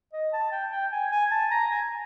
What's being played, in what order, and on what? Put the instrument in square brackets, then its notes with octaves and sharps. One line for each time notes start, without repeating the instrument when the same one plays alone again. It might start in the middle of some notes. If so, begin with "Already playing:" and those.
[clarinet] D#5
A5
G5
G5
G#5
G#5
A5
A#5
G#5